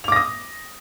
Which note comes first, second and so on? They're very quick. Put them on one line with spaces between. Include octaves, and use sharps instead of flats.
F7 D6 A#6 D#6